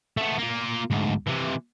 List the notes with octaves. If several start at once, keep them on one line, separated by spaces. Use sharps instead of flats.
A3 B3
A#3 F4
D2 G#2
C3 E3